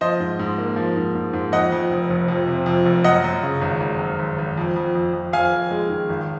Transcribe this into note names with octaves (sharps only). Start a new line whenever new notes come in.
F3 C5 D#5
G#2
G#2
A#3
F3
G#2
G#2
G#2
F2 D#5 F#5
F2
F1
F1
F2
C3
F2
F1
F#2 D#5 F#5
F#2
C#3
G#1
G#1
F#2
G#1
G#1
F2
F2
F2
F2
F2 F5 G#5
F2
G#3
D#3
G#1